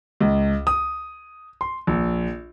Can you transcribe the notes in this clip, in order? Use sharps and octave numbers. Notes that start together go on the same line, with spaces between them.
C#2
D#6
C6
A#1